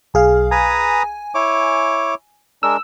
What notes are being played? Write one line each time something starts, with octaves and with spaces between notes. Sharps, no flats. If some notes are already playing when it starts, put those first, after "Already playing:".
B1 G#4 F5
B4 G#5 A#5 D#6
E4 C#5 D6
G#3 D4 A#4 E6